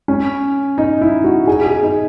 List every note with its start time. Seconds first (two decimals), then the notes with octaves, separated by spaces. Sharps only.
0.08 C#4
0.78 D#4
1.01 E4
1.24 F#4
1.47 G#4
1.65 G#4
1.83 D#4